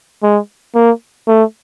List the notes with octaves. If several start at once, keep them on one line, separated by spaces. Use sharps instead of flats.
G#3
A#3
A3